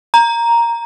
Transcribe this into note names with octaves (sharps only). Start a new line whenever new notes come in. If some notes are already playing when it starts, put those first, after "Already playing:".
A#5